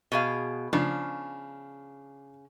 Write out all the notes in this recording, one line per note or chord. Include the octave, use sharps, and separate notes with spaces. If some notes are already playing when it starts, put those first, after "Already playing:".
B2 G#4 F5
C#3 F3 D4